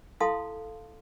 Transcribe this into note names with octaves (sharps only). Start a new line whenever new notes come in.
E4 A4 F5 A5 C6 D#6